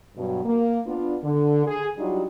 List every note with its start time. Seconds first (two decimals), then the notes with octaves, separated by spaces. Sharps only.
0.17 G2 B2 F#3
0.45 A#3
0.86 B3 D4 F4
1.24 D3
1.66 G#4
1.99 F#3 G3 D4 D#4 F4 F#4